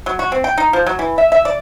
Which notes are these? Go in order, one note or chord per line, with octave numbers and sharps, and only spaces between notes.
F#3
F#4
C4
G5
D#4
F3
F#3
E3
E5
E5
D5